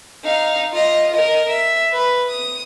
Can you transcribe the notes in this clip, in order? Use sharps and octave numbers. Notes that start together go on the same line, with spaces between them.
D#4 F5
F4 D#5
A#4 D#5
E5
B4
D#6